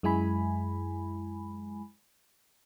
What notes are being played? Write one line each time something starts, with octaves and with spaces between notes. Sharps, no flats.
F#2 G#3 E4 G#5 B5